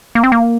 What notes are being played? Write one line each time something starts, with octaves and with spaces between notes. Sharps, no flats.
A#3
C4
A#3